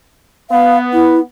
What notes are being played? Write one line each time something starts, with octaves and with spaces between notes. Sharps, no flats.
B3 F5
E4